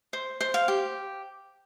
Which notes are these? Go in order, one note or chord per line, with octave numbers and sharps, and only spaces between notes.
C5
C5
F5
G4